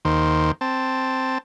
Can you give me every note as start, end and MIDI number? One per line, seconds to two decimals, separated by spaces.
0.05 0.51 39
0.05 0.51 51
0.05 0.51 72
0.61 1.38 60
0.61 1.38 81